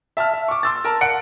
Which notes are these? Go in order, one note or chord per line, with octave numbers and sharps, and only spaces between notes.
E5 A5 E6 F6
E5
C#6 D6
C6 E6 A6
A#4 A5
F#5 C#7 D7